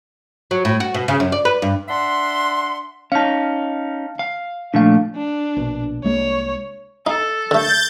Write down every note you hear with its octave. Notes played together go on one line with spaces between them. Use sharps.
F#3
A2
F#4
B2
C#3
F#2
D5
B4
G2
D4 E5 F#5 C6
C#4 D#4 F5 A5
F5
A#2 F3 A3 D4 F5
D4
A#1 B2
C2 G#3 A#3 C#5
D#4 A4
D3 A3 G6 A6